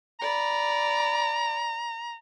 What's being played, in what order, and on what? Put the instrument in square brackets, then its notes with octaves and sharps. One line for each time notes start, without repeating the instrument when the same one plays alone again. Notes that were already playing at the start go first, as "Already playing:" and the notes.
[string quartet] D5 B5 [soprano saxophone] A#5